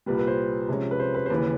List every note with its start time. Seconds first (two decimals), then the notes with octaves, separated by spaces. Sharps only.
0.06 C2 A#2 G3 B4
0.18 B4
0.27 C5
0.69 C3 F3 G#3 C#4
0.91 B4
0.99 C5
1.14 B4
1.26 C5
1.30 D#2 C#3 E3 B4